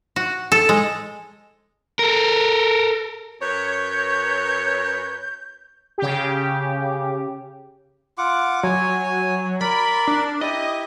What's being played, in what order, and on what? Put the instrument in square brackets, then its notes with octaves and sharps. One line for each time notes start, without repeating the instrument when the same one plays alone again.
[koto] F#4
A4
G#3
[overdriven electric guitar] A4 A#4
[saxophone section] F#2 B4 C#5 [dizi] G6
[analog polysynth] C#3 G4
[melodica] F4 F#5 D6
[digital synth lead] F#3 [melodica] C#5 G#5
[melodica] A#4 D5 [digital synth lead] B5
[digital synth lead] D4
[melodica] E4 G4 [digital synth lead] D#5